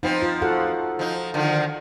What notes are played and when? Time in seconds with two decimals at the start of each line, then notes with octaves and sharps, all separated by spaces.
0.03 F3 B3 C4 D#4 C5
0.22 F4
0.42 F#4 A4 F#5
0.99 F3 D#4
1.34 D3 D#3 F3